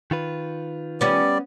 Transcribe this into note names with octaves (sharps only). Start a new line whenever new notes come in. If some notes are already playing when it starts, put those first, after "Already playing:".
D#3 F4 B4
G3 B3 C#4 D5